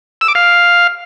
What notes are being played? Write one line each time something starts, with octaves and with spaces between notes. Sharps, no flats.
E6
D6
F5